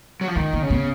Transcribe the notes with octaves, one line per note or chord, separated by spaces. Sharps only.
F#3
F3
D#3 G#3
A#3
C#3
B3